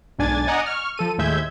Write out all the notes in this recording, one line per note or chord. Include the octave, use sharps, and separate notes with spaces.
B1 G#2 D4 G#5 G#6 A6
D5 D#5 F#5 G#5 A#5 D#6
C#6 F6
F3 A4 D#7
D#2 A2 G#3 E5 G6 G#6